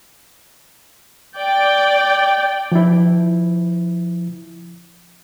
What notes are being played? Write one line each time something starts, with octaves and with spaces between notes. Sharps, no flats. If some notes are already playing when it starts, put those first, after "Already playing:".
D5 G5
F3 E4